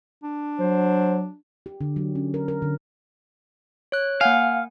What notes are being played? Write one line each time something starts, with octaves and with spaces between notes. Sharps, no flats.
D4
F#3 C5
G4
D3
F#3
C#4
A#4
A#4
D3
C#5 F#6
A#3 F5 F#5 G#5